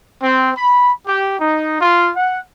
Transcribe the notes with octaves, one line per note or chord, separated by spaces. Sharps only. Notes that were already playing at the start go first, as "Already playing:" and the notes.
C4
B5
G4
D#4
F4
F#5